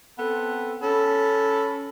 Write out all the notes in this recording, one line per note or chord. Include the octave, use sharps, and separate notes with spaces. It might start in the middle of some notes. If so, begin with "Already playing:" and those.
B3 C4 A4
C#4 A4 B5